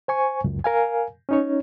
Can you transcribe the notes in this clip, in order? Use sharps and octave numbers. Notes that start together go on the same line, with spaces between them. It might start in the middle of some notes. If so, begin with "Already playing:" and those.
C5 G#5 C#6
C#2 F#2
A#4 F5 G#5
C#4 D#4 C#5